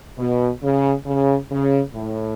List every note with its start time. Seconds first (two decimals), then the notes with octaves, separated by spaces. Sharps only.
0.18 B2
0.62 C#3
1.06 C#3
1.50 C#3
1.93 A2